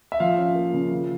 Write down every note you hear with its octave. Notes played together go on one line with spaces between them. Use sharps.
E5
F3 F5
C#4
A#3
C#3
F3